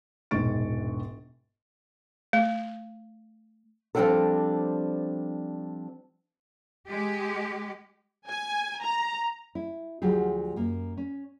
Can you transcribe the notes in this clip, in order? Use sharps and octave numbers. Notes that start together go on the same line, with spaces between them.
E1 A#1 G#2 C#6 A6 D7
A3
F3 G3 C4 D4 F4 A4
G#3 G4
G#5
A#5
E4
D2 F3 F#3 F4 G4 G#4
F#2 A#3
C#4